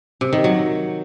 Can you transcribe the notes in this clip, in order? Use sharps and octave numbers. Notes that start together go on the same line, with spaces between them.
C3
D#3
F#3